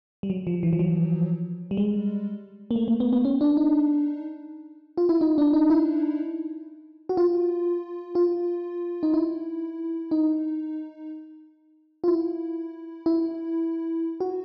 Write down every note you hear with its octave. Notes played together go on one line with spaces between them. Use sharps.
G3
F#3
F3
E3
F3
F#3
G3
G#3
A#3
A3
A#3
B3
B3
C#4
D4
D#4
F4
E4
D#4
D4
D#4
E4
F#4
F4
F4
D#4
E4
D#4
F4
E4
E4
F#4